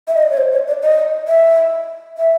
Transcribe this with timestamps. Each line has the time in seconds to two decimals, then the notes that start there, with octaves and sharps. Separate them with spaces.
0.08 E5
0.15 D#5
0.23 D5
0.30 C#5
0.37 C5
0.53 C#5
0.68 D5
0.83 D#5
1.28 E5
2.17 E5